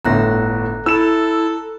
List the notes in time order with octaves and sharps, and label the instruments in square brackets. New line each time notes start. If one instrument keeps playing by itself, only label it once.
[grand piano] G1 A2 D3 [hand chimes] A#5 F#6 A#6
[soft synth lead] E4 [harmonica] A4 [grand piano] E6 E7